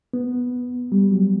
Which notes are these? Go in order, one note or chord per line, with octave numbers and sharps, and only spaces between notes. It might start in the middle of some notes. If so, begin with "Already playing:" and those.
B3
G3
F#3